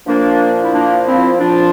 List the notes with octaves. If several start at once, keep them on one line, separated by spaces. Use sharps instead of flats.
A#2 F3 A#3 D4
E4
A#3 D4
C4 E4
A#2 F3 D4 F4